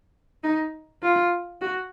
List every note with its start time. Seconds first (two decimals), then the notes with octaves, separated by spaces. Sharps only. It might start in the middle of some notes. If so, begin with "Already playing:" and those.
0.43 D#4
1.03 F4
1.62 F#4